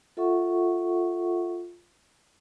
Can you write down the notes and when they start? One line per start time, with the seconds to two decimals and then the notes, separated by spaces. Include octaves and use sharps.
0.17 F4 A4 E5 F#5 C#6